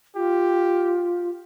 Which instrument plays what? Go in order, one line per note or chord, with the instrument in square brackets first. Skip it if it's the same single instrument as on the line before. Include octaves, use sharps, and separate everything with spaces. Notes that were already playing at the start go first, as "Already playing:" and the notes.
[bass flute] F4 [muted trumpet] G4